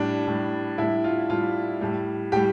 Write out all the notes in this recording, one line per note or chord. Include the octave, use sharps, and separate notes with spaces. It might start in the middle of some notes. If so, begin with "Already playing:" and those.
Already playing: A2 G3 D4
A2 G3
A2 G3 E4
F4
A2 G3 F4
A2 G3
A2 G3 G4